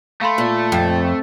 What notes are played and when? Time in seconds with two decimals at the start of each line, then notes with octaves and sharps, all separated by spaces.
0.21 A3 F5 B5 C6
0.38 A#2
0.72 F2 G5